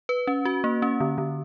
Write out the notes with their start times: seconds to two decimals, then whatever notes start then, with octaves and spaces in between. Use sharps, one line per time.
0.09 B4
0.27 C#4
0.45 F#4
0.64 A#3
0.82 C#4
1.00 D3
1.18 D3